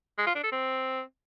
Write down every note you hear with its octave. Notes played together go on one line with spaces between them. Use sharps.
G#3
F4
D4
A4
C4